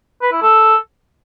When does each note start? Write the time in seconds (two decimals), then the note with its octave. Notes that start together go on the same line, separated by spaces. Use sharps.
0.22 B4
0.32 E4
0.42 A4